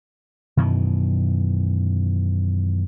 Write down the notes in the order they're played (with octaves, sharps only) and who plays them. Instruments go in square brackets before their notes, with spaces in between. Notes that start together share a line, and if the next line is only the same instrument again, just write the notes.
[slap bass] F#2 B2 D#3 E3